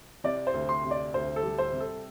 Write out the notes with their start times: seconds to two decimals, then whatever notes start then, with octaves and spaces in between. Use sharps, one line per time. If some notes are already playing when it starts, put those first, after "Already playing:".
0.24 C3 D5
0.47 C5
0.54 D2
0.69 C6
0.84 C3
0.91 D5
1.14 D2 C5
1.36 A4
1.43 G3
1.58 C5
1.73 C3
1.80 A4